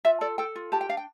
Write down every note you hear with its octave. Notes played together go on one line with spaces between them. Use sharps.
F4 E5
A4 D5
A4 G5
F4
G4 A5
G5
D4 F5
G5